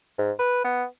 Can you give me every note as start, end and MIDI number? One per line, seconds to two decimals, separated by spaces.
0.18 0.32 44
0.39 0.62 71
0.65 0.85 59